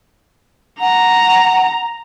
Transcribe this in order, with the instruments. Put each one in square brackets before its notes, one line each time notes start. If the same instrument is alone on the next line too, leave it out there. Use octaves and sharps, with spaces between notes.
[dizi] F#5 [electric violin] A#5